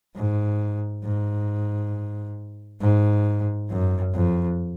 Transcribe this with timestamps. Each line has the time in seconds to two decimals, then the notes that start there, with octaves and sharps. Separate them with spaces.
0.15 G#2
1.04 G#2
2.81 G#2
3.69 F#2
4.14 F2